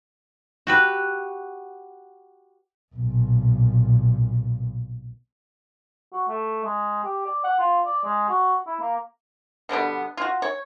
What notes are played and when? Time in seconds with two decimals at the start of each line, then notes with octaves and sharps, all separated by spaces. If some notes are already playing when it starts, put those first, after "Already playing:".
0.67 F#4 G4 B4
2.94 B1 A#2
6.13 F#4
6.28 A3
6.64 G#3
7.04 G4
7.26 D5
7.44 F#5
7.59 F4
7.85 D5
8.04 G#3
8.29 F#4
8.67 E4
8.80 A#3
9.69 B2 D3 G3 B3
10.17 F4 F#4
10.42 C#5